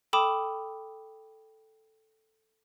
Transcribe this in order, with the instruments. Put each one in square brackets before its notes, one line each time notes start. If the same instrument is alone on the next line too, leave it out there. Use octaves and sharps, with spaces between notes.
[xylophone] A4 G5 B5 D6 D#6 E7